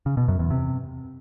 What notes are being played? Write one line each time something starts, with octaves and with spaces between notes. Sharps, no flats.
C#3
B2
F#2
E2
C3